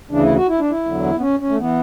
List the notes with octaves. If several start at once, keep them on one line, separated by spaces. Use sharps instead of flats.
D2 C#3 E3 D4
E4
F#4
E4
D4
E4
E2 D3 F#3
B3
C#4
C#4
A3
E3 B3